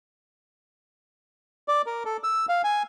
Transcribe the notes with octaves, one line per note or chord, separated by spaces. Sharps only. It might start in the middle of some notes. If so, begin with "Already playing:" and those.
D5
A#4
A4
E6
F5
G#5